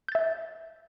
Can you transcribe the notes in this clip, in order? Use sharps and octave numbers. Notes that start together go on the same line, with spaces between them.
E5 G6 A6